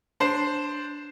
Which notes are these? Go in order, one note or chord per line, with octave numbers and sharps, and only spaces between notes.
D4 C5 C7